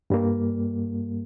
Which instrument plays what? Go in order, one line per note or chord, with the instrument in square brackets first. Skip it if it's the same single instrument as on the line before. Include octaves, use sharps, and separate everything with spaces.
[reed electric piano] G2 G3 A#3